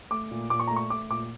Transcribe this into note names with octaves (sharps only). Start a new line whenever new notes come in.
A3 D6
A#2
A#2 D6
C#6
A3 A#5
C#6
A3 D6
A#2 D6